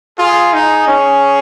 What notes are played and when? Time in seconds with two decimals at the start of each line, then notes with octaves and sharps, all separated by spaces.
0.19 F4 G#4
0.53 D#4
0.88 C#4